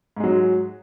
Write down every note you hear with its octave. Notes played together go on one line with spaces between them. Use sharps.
G#2 F#3 G#3